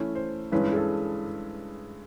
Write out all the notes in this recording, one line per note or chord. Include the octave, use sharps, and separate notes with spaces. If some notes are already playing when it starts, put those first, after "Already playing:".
Already playing: E3 A3 C#4 E4
C5
G2 E3 G#3 C#4 B4
G#4
A4